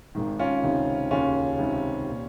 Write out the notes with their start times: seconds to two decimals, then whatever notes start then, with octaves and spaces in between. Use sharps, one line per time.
0.15 G#1 G#2 D#3
0.39 C#4 F4
0.63 C#2 C3 D#3
1.11 D#2 C#3 C#4 F4
1.58 C#2 C3 D#3
2.08 A#2